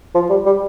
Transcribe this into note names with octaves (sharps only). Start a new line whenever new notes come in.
F3
G3
G3